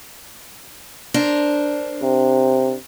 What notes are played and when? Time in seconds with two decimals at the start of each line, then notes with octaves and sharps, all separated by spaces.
1.14 D4 A#4 C5
2.02 C3